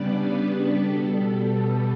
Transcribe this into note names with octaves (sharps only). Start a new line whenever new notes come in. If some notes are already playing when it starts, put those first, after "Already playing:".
Already playing: C#3 G3 B3 D4 B4 D5
B2 G3 B3 A4